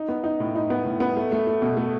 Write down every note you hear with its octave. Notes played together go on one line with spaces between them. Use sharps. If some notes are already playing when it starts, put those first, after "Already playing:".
Already playing: D#4
B3
D#4
A2
D#4
B3
A2
B3
A3
A3
A3
B2
A3